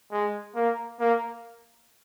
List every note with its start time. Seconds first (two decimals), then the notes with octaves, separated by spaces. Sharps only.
0.12 G#3
0.56 A#3
1.00 A#3